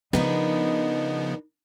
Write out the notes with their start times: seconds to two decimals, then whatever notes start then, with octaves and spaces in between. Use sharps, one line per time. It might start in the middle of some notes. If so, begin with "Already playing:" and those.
0.13 C#3 F3 B3 D4 D#4 A#4 B4 D#5